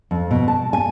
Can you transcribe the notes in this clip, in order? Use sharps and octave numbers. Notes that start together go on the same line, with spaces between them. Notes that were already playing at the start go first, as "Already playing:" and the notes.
F2
B2
A5
G#5